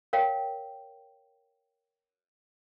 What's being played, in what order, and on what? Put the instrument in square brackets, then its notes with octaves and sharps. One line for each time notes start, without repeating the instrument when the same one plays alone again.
[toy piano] A#4 C#5 F5 G5